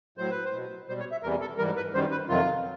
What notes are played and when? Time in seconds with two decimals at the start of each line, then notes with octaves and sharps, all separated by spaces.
0.18 A2 F#3 C5
0.31 B4
0.45 C5
0.53 B2 F#3
0.88 B2 G3 C5
1.00 C#5
1.11 E5
1.23 E2 C3 E3 G3 A#4
1.41 A4
1.58 G#2 E3 G3 A#4
1.76 B4
1.93 F#2 D#3 G3 C5
2.11 B4
2.28 F2 C3 D#3 F#3 F4